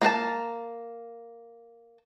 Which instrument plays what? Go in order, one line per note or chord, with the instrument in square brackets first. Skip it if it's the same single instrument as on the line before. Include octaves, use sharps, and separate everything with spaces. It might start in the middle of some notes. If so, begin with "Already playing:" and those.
[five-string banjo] A#3 A#4 B4 A5